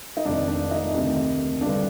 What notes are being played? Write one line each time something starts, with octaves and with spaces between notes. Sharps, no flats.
D#4
F1 F2 D#3 D4
D4
D#4
D2 C3 D#3
G1 G2 D3 D4